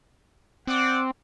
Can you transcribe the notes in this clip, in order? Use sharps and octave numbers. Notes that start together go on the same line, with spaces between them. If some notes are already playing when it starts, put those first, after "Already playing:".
C4 D5 F#5 D6